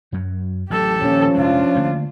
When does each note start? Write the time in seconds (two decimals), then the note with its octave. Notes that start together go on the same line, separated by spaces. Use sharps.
0.12 F#2 F#3
0.70 A1 F#3 G4 A4
1.02 D#1 D#3 F3 A#3 C#4
1.35 F1 G#3 D4 F4
1.75 D3 A3 A#3